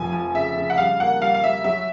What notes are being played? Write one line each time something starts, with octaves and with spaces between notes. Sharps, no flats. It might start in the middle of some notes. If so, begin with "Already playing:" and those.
Already playing: F1 F3 G#5
F3
C#3 E5
C#3
F#5
G3 F5
A#3 F#5
G3 F5
F5
G3 E5
F#3 E5